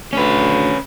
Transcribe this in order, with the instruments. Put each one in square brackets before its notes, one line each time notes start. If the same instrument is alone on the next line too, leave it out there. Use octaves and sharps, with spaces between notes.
[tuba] D2 [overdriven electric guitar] C#4 B4